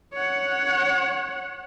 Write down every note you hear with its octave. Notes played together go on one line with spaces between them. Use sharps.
C#5 F#5